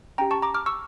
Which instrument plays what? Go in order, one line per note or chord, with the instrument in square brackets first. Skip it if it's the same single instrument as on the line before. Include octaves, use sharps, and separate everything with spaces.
[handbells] C#4 G4 G5 A#5
A5 C#6
A#5 D6
D6 F6
C#6 E6